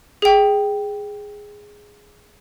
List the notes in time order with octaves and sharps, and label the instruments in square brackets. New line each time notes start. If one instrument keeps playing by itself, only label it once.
[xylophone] G#4 G5